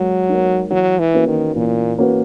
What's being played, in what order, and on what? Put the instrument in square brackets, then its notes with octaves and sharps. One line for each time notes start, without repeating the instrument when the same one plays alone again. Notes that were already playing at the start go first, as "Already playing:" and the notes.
Already playing: [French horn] F#3 [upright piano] G#3 A#4
[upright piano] D#4 A#4 C#5
[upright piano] E3 [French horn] F#3
[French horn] E3
[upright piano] A#3 C#4 F#4 B4
[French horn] D#3
[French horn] A#2 [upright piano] E3
[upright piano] A#3 C#4 F#4 B4